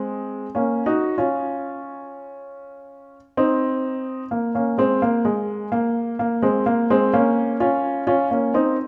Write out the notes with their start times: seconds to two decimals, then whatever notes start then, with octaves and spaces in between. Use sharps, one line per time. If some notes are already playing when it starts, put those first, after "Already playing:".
Already playing: G#3 C4
0.55 A#3 C#4
0.86 D#4 F#4
1.18 C#4 F4
3.37 C4 D#4
4.31 A#3
4.55 A#3 C#4
4.78 G#3 C4
5.02 A#3
5.25 G#3
5.72 A#3
6.19 A#3
6.42 G#3 C4
6.66 A#3
6.90 G#3 C4
7.13 A#3 C#4
7.60 C#4 F4
8.07 C#4 F4
8.31 A#3 C#4
8.54 C4 D#4